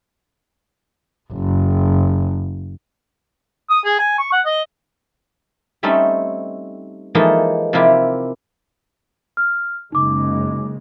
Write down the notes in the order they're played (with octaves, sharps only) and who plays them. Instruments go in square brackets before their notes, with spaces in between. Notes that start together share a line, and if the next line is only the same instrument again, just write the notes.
[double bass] F#1
[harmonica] D#6
G#4
G#5
C#6
F#5
D#5
[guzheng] G3 A3 C4 C#4 D#4 A4
E3 F3 G#3 A#3 D#4 A4
C3 F3 A#3 E4 F4 G4
[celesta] F6
[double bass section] F#1 C#3 G#3 [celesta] D#4 D6